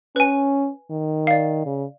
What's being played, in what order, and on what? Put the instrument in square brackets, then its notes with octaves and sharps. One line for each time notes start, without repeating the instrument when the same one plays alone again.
[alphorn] C#4 [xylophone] B4 G#5
[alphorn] D#3
[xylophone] D5 F5
[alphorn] C#3